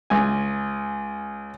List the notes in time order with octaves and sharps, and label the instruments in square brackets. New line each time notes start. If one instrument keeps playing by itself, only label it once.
[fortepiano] C#2 G#5